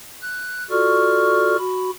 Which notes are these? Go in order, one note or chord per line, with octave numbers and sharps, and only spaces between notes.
F#6
F4 F#4 A4 D5 C#6 F6
F#4 B5